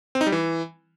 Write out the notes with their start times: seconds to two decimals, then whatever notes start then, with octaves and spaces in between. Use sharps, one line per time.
0.15 C4
0.21 D#4
0.27 G3
0.32 E3